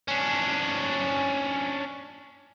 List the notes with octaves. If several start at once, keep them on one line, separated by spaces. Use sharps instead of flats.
C#4 D4